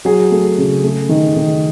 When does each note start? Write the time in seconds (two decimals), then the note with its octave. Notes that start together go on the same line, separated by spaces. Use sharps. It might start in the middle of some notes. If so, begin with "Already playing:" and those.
0.05 F#3 G#4
0.31 A3
0.58 C#3
0.83 A3
1.09 D#3
1.36 D#3